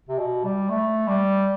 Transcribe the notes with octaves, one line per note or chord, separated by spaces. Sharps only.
C3
B2
G3
A3
G3